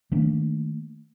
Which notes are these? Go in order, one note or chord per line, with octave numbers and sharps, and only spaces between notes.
D#3 A3 A#3 D4